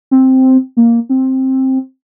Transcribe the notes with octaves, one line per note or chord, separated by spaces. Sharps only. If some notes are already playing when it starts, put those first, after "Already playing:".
C4
A#3
C4